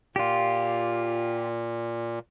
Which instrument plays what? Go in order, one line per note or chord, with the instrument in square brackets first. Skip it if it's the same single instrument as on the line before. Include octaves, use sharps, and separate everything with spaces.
[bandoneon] A#2 [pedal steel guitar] F4 G4